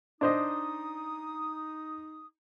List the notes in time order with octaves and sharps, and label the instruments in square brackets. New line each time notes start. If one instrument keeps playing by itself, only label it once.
[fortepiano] D4 C5 D#5 [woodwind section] D#4 D#6